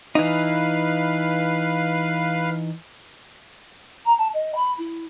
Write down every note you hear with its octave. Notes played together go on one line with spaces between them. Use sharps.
E3 D#4 B4 F5
A#5
A5
D#5
B5
E4